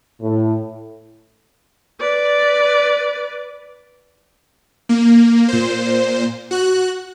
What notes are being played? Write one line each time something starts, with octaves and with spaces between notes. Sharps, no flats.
A2
B4 D5
A#3
A#2 C5
F#4 F#6